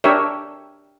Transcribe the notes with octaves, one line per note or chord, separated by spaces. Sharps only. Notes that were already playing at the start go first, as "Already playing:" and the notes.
D4 G4 A#4 C#5 E5